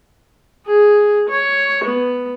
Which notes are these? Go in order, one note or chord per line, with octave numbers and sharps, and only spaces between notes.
G#4
C#5
B3